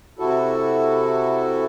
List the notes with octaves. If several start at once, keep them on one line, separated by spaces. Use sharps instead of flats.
C3 E4 F#4 A4